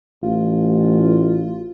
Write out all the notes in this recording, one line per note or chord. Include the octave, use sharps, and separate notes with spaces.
A1 F4